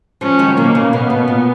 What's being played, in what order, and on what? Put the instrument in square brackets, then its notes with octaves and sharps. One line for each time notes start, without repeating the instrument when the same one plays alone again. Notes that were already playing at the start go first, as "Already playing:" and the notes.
[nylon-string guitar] F3 G#3 [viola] C#4
[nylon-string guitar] D#3 F#3
[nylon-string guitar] B2 D#3 [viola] A#3
[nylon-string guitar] C#3
[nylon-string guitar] B2 [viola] B3
[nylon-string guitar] B2
A#2